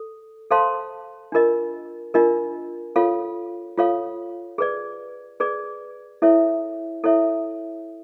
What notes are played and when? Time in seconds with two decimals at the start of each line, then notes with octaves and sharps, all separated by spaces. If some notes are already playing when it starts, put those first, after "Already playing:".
Already playing: A4
0.51 A4 C5 F5 A5 C6
1.32 D4 F4 A#4 D#5
2.14 D4 F4 A#4 D#5
2.96 F4 A4 C#5 F5
3.78 F4 A4 C#5 F5
4.58 G#4 B4 D5
5.40 G#4 B4 D5
6.22 E4 A4 C#5 E5
7.04 E4 A4 C#5 E5